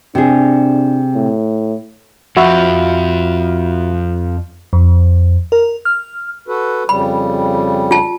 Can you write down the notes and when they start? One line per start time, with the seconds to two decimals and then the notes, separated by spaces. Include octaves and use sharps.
0.15 C3 D4 G#4
1.14 A2
2.37 F2 F3 F#4 E5 B5
4.73 F2
5.52 A#4
5.85 F6
6.48 F#4 A4 B4
6.89 F2 C#3 G3 B5
7.91 F4 A5